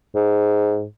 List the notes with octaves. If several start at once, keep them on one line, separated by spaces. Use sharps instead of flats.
G#2